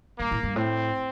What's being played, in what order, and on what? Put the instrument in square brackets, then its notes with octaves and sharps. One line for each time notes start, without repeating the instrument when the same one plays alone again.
[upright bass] G2 [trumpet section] A#3
[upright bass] A2
G2
[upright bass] A2 [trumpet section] C4